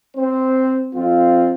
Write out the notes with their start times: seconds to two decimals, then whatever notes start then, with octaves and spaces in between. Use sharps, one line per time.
0.16 C4 C5
0.95 F2 C4 F4